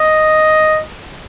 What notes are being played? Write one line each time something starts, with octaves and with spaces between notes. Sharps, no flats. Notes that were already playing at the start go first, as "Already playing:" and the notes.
Already playing: D#5